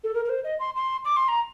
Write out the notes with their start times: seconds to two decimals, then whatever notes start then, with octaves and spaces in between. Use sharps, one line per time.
0.04 A4
0.14 A#4
0.25 A#4
0.29 C5
0.44 D#5
0.59 C6
0.76 C6
1.05 D6
1.16 C6
1.28 A#5